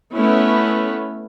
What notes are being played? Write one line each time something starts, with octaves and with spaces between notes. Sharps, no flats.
A3 B3 C#4 E4